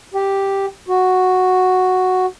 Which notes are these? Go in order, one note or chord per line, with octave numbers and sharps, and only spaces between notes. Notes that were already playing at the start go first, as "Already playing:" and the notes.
G4
F#4